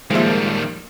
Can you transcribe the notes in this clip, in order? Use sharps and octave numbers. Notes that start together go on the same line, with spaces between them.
D#3 F3 G3 G#3 A#3 E5